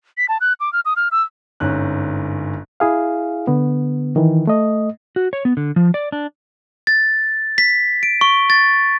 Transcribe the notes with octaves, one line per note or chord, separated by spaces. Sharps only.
B6
A5
F#6
D6
F6
D#6
F6
E6
G1 G#2 C#4 F#6
E4 G#4 F5
D3 B3
D#3 E3
A3 D#5
F#4
C#5
B3
D3
F3
D5
D4
A6
B6
D7
C#6
A6